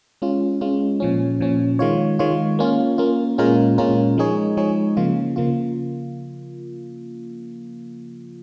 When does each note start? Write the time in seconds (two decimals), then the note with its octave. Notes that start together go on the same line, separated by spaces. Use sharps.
0.22 G#3 C#4 F4
0.61 G#3 C#4 F4
1.00 A#2 F3 C#4
1.40 A#2 F3 C#4
1.79 D#3 G#3 F4 C#5
2.19 D#3 G#3 F4 C#5
2.59 A#3 C#4 F4
2.98 A#3 C#4 F4
3.38 A#2 G#3 C#4 F4 A#4
3.78 A#2 G#3 C#4 F4 A#4
4.18 F3 G#3 D#4 G#4 C#5
4.57 F3 G#3 D#4 G#4 C#5
4.97 C#3 F3 A#3 F4
5.36 C#3 F3 A#3 F4